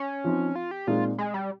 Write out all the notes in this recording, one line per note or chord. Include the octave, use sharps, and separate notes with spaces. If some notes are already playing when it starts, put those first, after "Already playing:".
Already playing: C#4
F3 C4 D#4
F4
G4
A#2 G#3 C4 D#4 F4
G#3
G3